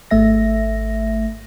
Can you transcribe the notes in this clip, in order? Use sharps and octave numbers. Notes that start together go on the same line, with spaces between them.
G#1 A3 E5 A#6